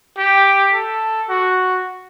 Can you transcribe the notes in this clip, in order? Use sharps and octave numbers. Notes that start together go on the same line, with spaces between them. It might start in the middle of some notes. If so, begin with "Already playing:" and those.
G4
A4
F#4